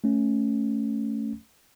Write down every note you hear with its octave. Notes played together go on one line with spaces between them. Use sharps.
A3 C#4